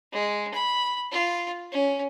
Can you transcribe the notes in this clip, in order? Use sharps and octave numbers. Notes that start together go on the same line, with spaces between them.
G#3
B5
F4
C#4